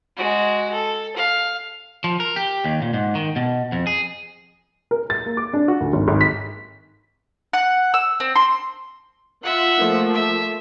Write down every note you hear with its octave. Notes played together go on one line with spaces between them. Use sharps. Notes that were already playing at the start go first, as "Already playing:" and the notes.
G#3 F#4
A4
F5
F3
A#4
G4
D#2
A#2
G#2
D#3
B2
F2
G#4
A#4
A6
A#3
D6
D4
F#4
D2
G#1
G#1
B6
F#5
E6
C4
C6
F4 E5 F#5
F3 A3 A#3
E5